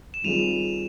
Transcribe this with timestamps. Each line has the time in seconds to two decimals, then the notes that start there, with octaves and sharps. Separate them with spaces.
0.14 E7
0.24 D#3 G3 C4 F4 G#4 D#7 F7